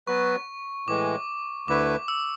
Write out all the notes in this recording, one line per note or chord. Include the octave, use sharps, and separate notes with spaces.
F#3 B3 F#4 B4 C#6
A2 E3 G#3 D6
D2 D3 A3 E4 B4 D6
E6